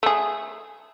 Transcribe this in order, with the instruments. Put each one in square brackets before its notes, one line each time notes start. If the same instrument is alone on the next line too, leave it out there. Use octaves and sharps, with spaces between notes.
[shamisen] A3 G#4